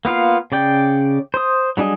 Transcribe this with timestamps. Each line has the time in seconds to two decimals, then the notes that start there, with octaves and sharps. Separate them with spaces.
0.05 A#3 B3 F4 F5
0.52 C#3 D5 G5
1.34 C5 D#6
1.77 F#3 G3 D4 G#4 D#5